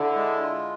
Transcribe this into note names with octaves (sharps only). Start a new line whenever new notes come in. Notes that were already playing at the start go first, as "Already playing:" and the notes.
Already playing: D3 E4
G#3
F4